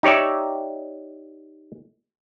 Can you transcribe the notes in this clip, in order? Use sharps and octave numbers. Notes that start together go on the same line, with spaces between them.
D#4 G4 C#5 D5 E5